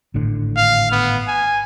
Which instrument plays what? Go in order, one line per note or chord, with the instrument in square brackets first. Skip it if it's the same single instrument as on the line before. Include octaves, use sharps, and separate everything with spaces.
[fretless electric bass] G#1 A2 D3
[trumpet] F5
B3
G#5